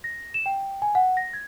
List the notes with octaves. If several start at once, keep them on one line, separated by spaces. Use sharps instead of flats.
A#6
E7
G5
G#5
F#5
A#6
G#6